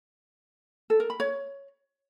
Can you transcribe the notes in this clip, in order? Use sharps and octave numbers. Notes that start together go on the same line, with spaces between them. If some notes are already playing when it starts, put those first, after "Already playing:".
A4
A#4
B5
C#5